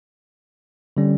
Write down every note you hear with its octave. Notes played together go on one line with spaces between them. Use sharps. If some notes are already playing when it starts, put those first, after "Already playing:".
D3 G3 C#4